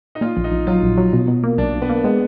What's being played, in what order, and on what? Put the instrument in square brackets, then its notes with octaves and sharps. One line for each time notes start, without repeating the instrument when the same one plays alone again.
[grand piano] D#4
[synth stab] A#2 [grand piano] F4
[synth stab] A#1
[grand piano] D#4
[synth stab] A#1
[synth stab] F#3 [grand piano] F4
[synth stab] A#1
F#3
B2
B2
A#3
[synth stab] B1 [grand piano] D4
[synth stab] B1
[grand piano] B3
[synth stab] A#3
[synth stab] G#3 [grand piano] B3